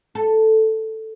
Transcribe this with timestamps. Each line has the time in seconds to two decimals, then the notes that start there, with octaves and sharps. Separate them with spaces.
0.15 A4